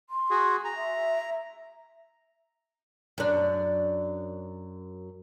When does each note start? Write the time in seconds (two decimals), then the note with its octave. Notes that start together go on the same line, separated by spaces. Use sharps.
0.10 C6
0.30 F#4 G#4
0.64 G#5 A#5
0.76 E5
3.18 F#2 D4